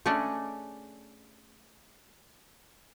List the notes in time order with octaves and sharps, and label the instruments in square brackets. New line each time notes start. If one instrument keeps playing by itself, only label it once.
[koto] A3 C#4 D4 G#4 B4 D#5